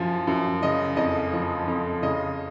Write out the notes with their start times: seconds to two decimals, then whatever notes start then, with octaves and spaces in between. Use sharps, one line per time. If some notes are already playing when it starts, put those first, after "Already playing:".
Already playing: F#2 F3
0.27 F#2
0.63 C#3 D#5
0.97 F2 D#5
1.33 F3
1.68 F2
2.03 C#3 D#5